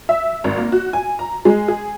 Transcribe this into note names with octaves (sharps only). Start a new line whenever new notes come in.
E5
G#1
A#3
F#4
G#5
A#5
G#3
G#4